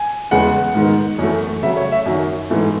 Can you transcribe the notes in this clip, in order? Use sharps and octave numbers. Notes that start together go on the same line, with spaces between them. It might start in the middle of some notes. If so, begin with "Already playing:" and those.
Already playing: G#5
E2 C#3 G#3 B3 F#5
G#2 D#3 G#3 B3
F#2 E3 A3
C#3 F#3 A3 E5
C#5
E5
F#2 D#3 F#3
G#2 E3 A3